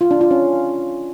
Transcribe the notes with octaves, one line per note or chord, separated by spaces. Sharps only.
F4
D4
F4
C#4